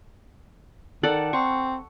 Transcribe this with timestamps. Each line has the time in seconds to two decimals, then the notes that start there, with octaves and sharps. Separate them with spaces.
1.03 D#3 A4 D5 F#5
1.33 C4 C#6